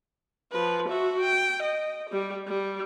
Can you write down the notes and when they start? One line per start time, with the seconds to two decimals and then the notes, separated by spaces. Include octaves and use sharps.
0.52 F3 B4
0.88 F#4 E5
1.20 G5
1.63 D#5
2.09 G3 G4
2.48 G3